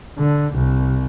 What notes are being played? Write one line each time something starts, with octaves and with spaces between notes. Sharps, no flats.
D3
C2